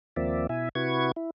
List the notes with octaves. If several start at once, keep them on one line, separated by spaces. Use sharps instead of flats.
D#2 F3 A#3 C4 D5 E5
B2 E4 E5 G#5
C3 E4 F#4 B4 C#6 G#6
E4